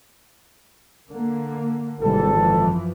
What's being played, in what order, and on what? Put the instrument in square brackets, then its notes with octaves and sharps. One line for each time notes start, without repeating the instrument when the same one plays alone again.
[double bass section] D3 A#3
[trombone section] G#1 A4 [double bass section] C3 E3 G3
[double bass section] F#2 E3 F3